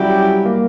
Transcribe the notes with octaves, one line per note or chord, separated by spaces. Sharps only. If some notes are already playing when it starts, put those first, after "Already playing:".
Already playing: F#3 G3 C#4 E4 G4
A#3